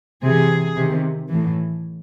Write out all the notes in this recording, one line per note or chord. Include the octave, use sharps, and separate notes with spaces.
C3 E3 G#4
C3 D#3
A2 E3